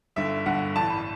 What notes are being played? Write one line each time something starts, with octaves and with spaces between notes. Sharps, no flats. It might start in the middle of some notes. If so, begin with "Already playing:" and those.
G1 G2 D3 E5
G1 G2 D3 F#5
A1 G2 E3 A5
B5